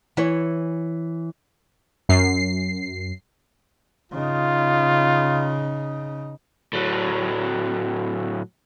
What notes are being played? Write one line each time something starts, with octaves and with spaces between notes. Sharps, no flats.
E3 E4 C#5
F#2 C7
C#3 D#4 F4
A2 F#3